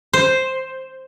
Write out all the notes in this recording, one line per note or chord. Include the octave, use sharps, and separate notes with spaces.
C5